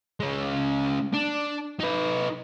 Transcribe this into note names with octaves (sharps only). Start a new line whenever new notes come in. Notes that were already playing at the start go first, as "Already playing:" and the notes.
G#3 C#4
D4
D#4 B4